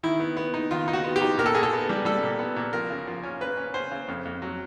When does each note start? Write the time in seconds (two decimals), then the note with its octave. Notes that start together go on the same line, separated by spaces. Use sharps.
0.03 D#3 E4
0.20 B3
0.37 B3
0.54 D#4
0.71 D#3 F4
0.88 D#4
0.93 F#4
1.04 B3
1.16 G4
1.21 D#4
1.38 A#2 A#4
1.46 A4
1.55 A#2 G#4
1.63 A4
1.73 B3
1.89 G3
2.05 G3 A4
2.23 A#2
2.39 B3
2.56 A#2
2.73 F3 A#4
2.90 C#3
3.07 F3
3.23 C#4
3.40 C#3 B4
3.57 C#4
3.74 C#4 C5
3.91 C#3
4.08 F2
4.25 F2
4.42 F#3